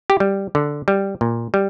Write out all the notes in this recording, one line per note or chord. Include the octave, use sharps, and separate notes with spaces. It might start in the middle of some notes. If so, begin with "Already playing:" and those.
G4
G3
D3
G3
A#2
G3